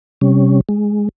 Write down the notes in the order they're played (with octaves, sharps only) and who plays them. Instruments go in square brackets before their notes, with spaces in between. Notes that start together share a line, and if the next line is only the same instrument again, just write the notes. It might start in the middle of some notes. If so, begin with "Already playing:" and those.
[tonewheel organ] C3 G3 C#4
G#3